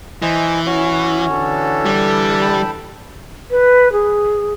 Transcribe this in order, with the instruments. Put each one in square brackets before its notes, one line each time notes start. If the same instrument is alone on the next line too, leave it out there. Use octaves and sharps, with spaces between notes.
[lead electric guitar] E3 [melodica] C5 D#5 G#5
[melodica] C#4 F#4 C#5
[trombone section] D3 E3 A4
[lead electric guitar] G3
[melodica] G5 A5 B5
[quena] B4
G#4